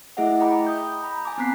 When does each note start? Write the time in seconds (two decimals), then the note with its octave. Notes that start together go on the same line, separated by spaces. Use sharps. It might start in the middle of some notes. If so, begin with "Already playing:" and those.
0.17 A3 E4 G#4 D#5 E5 F#5
0.40 D#5 G5 A#5 B5 D6
0.67 D#6 G6
1.03 A#5 B5
1.25 G#5 A5 D6
1.38 B3 C4 A#5 F#6 B6 C7